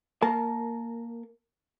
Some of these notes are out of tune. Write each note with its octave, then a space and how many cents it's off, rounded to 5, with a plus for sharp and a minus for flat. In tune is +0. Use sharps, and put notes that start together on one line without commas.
A#3 +0 A#4 -15 A5 -30